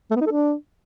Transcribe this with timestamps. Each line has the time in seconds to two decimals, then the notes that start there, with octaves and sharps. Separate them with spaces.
0.11 A3
0.16 B3
0.21 D#4
0.26 A4
0.31 D4